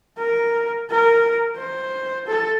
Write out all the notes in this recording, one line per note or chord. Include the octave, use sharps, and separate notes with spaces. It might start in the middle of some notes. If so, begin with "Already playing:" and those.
A#4
A#4
C5
A4